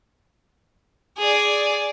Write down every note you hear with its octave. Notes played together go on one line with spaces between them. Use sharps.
G#4 D5